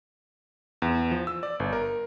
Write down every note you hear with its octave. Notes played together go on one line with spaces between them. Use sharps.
E2
F3
E6
D5
G1
A#4